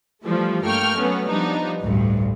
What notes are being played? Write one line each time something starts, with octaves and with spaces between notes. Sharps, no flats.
E3 F3 G3 A3 F4
G2 A3 A#3 G5 C#6 F6
F#3 A3 B3 C#4
F3 G3 B3 D4 D#4
A1 D2 G2